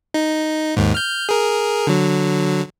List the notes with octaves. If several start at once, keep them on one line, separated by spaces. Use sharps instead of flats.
D#4
D#2 G#2
F6 G6
G#4 A#4
D3 F#3